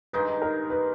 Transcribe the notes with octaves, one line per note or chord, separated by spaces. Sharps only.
G2 D#3 G#3 D#4 B4
A#4
B4